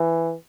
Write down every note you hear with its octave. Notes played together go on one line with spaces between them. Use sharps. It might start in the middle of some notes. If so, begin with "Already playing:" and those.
Already playing: E3